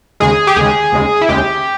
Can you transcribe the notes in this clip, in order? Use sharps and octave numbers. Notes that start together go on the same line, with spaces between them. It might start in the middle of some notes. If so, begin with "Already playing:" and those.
D#2 C#3 G#3 G#4
G4
D#2 C#3 G#3 G#4
D#2 C#3 G#3
E4
D#2 C#3 G#3 G4